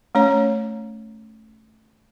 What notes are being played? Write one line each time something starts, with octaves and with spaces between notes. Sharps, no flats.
A3 C#4 C#5